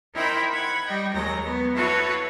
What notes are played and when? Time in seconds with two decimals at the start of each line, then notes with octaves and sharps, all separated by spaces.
0.15 D#4 E4 A#4 C5 G5 B5
0.53 F#5 B5 G#6
0.85 G3 D#5 G5
1.15 D#2 F#3 G#3 A#5 A#6
1.44 B3
1.77 E4 F#4 A4 B4 C#5 F5